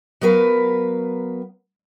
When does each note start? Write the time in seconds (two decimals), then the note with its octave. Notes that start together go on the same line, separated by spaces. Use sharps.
0.21 F#3 B3 A#4 B4 F5